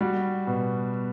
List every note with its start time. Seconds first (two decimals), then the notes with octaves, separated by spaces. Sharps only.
0.01 G3 F#4
0.47 B2